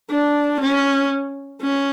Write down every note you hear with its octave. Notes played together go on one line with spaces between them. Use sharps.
D4
C#4
C#4